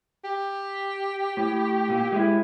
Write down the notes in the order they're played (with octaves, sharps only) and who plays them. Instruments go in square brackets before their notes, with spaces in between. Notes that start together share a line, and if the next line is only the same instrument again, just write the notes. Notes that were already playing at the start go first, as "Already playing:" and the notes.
[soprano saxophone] G4
[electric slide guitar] A2
A#2
G#3 E4